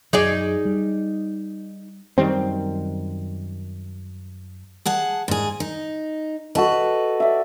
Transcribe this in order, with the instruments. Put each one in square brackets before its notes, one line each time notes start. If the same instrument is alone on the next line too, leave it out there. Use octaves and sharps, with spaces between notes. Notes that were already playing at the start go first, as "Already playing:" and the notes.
[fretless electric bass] F#2 F#3 [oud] D#4 G#4 D5
[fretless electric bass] G3
F#2 D#3 G3 C4
[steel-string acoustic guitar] G#4 F#5 A5
G#2 G#4
D#4
[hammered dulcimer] F#4 A4 D#5 [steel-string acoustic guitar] B4
[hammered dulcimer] D5 E5